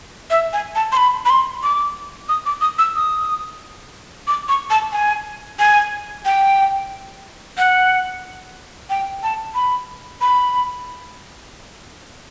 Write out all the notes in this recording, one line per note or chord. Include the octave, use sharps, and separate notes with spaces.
E5
G#5
A5
C6
B5
B5
C6
D6
D#6
D6
D#6
E6
D#6
D6
C#6
A5
G#5
G#5
G5
F#5
G5
A5
B5
B5